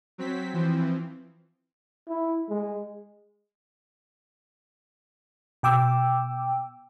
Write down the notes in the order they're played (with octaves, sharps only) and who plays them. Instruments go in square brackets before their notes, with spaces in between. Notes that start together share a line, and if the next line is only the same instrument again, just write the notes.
[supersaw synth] F#3 C4 B6
E3 F3 C4
[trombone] E4
G#3
[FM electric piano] B2 G5 D6 E6